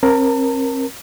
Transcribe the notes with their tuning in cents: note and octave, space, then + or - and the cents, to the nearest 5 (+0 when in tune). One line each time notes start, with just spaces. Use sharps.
C4 +40 A#4 +15 A5 +35